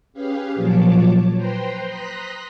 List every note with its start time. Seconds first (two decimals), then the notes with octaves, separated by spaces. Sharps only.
0.13 C#4 G4 G#4 B4 F5
0.55 A#2 F3 F#3 C#5 A5 D6
1.35 B4 C5 G5 A#5 C6
1.83 A#5 C6 D#6 F#6 A#6 B6